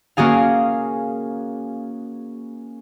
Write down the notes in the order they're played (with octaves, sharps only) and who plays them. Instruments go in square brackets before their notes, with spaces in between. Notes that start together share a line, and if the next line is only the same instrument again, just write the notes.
[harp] A#3 C#4 F#4 G#4 F5